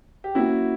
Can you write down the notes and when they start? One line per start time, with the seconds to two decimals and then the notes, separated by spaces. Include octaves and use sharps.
0.24 G4
0.35 F#3 A#3 C#4 E4 F#4